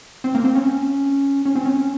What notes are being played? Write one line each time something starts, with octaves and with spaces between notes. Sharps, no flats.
C4
A#3
C4
C#4
C#4
C4
C#4